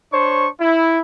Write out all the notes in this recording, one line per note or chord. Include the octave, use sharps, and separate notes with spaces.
D4 C5 C#5 C#6
E4